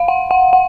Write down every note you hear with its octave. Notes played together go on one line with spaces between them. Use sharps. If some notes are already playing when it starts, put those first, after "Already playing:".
Already playing: F5
F#5
F#5
F#5